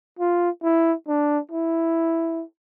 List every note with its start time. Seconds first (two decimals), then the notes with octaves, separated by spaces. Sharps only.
0.19 F4
0.63 E4
1.08 D4
1.52 E4